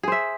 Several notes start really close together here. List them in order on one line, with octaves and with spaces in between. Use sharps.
G#4 C5 E5